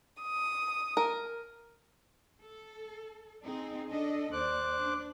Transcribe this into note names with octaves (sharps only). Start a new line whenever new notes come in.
D#6
A#4
A4
C4 D#4 G#4
D4 A4 D#5
D#2 C5 D5 D6 F#6
D4